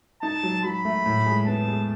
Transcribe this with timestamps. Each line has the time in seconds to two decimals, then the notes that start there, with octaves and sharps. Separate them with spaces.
0.22 D#4 A5
0.43 F#3
0.64 F#3 B5
0.85 A3
1.06 A2
1.26 G#3
1.47 B3 A5
1.68 G#3